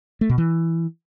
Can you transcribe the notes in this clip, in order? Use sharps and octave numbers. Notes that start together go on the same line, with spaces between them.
A3
B2
E3